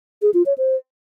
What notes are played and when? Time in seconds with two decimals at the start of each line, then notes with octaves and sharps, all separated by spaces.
0.22 G#4
0.34 F4
0.46 C#5
0.58 C5